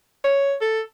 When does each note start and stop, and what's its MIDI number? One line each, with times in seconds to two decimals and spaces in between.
0.24 0.54 73
0.62 0.81 69